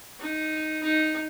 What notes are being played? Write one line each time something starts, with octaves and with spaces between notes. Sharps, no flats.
D#4
D#4